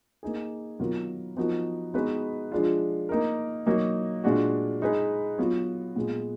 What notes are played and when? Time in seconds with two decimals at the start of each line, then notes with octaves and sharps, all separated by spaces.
0.23 A#3 D#4 G#4
0.79 D#3 F#3 B3 F4 A#4
1.36 F3 B3 D#4 F#4 A#4
1.94 G#3 B3 D#4 F#4 B4
2.52 F3 G#3 D4 F4
3.09 A#3 D#4 A#4
3.66 F#3 A#3 D#4
4.24 A#2 G#3 D4 F#4
4.82 G#3 D#4 G#4 B4
5.38 F#3 B3 F4
5.96 A#2 G#3 B3